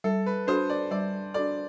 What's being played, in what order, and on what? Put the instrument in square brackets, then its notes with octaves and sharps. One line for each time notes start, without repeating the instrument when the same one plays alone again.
[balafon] G3 [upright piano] A4
[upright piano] B4
[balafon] D4 F#4 A4 [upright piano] C5
[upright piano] D5
[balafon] G3 [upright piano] D5
[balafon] D4 F#4 A4 [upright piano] D5